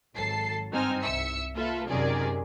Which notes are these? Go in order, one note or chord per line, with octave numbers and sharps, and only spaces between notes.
G#1 F#3 A4 A5 C7
G2 C4 D#4 G#5 F6
C2 E5 E6 C#7
A#3 F4 A4 B4 E5
F#2 C3 D#3 G#4 A#4 D5